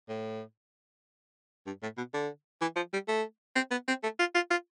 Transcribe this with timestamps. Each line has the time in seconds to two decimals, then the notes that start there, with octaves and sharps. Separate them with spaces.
0.09 A2
1.67 G2
1.83 A2
1.97 B2
2.14 D3
2.61 E3
2.76 F3
2.93 G3
3.08 A3
3.56 C4
3.71 B3
3.88 C4
4.03 A3
4.19 F4
4.35 F4
4.50 F4